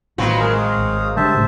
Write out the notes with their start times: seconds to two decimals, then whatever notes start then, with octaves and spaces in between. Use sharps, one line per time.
0.18 A1 B2 D#3 F#3 C4 F4 B4
0.40 G#3 G#4 A#4
0.58 F5 D#6
0.77 G#1
1.17 D3 G3 G#3 C5 E5 A5
1.34 G#1 A2 C#3